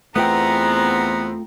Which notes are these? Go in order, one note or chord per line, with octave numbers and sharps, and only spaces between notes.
E2 A3 B3 C4 F4 G5 A#5